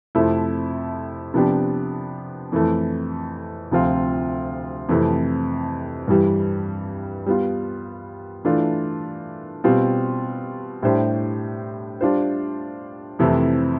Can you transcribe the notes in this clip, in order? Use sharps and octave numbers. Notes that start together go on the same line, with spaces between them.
F2 C3 F3 A3 E4
C3 F3 B3 D4 G4
F2 E3 A3
D2 C3 F3 C4 F4
F2 C3 E3 A3
G2 E3 G3
G3 B3 F4
E3 A3 D4 F4
B2 G3 C4 F4
A2 G3 D4 G4 C5
G3 D4 F4 C5
F2 C3 E3 A3 E4